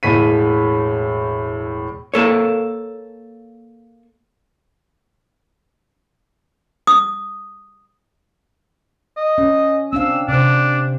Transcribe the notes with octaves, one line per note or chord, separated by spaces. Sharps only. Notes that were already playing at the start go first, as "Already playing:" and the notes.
E1 A2 B6 D#7
A#3 A4 C#5
D#6
D#5
C#4
C4 D4 F5 E6
C3 D4 C5